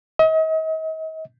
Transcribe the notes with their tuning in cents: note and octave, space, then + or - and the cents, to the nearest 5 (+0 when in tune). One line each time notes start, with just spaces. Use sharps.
D#5 +40